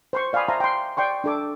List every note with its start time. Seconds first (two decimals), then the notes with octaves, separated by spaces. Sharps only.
0.13 C5 C6 C#6
0.33 D5 F5 G5 G#5 B5 D#6
0.48 C5 E5 F5 A5 A#5 C6
0.60 G5 C6
0.97 D5 G5 C6 C#6
1.24 D4 A4 D6